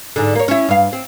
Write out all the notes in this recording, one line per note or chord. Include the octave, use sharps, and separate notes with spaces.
G#2 D3
A#3 C#5
C#4 E4
G2 F5
C4